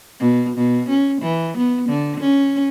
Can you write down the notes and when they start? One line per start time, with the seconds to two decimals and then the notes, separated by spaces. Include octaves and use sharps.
0.20 B2
0.57 B2
0.89 C#4
1.22 E3
1.58 B3
1.89 D3
2.20 C#4